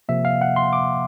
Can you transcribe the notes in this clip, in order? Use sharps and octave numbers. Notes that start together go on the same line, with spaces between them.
C3 F3 A#3 E5
F5
F#5
C6
D6